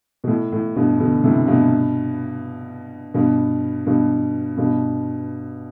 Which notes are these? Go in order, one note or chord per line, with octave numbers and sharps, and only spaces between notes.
B2
A2
A2
G2 B2
B2 D3
A2 C3
G2 B2
G2 B2
G2 B2
G2 B2